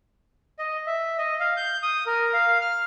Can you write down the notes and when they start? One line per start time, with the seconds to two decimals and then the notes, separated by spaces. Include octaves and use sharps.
0.59 D#5
0.87 E5
1.18 D#5
1.40 F5
1.57 G6
1.83 D#6
2.06 A#4
2.33 F5
2.61 F6